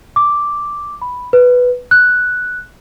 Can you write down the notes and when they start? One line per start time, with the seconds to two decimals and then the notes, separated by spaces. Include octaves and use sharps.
0.16 D6
1.02 B5
1.33 B4
1.91 F#6